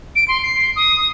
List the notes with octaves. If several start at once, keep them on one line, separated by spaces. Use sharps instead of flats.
D7
C6
C7
D#6